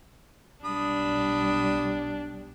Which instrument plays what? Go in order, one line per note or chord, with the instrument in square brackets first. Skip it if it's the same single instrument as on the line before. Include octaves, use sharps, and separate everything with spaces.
[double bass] B1 G3 [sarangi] D4 [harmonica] B5 D#6